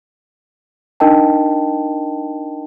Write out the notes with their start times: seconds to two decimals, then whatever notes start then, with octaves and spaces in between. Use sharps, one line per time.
1.00 D4 D#4 A#4 D#5 G5 A5